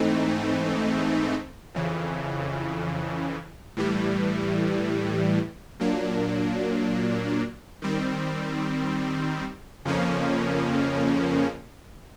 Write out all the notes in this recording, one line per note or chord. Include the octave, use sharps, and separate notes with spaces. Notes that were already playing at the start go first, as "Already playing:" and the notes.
Already playing: G#2 E3 A3 C4 D#4
F2 C#3 E3
A2 E3 G3
A#2 F#3 A#3 D4
D#3 G3 C4
F2 C#3 F3 A#3 C#4